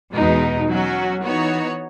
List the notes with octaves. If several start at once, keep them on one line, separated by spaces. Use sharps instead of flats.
E2 B2 G#3 D#4
F#3 C#4 F#4
E3 B3 D#4 F#4 C#5